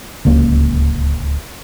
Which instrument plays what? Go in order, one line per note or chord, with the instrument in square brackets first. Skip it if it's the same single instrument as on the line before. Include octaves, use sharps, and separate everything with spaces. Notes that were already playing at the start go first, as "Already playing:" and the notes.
[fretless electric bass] D1 C#2 A#3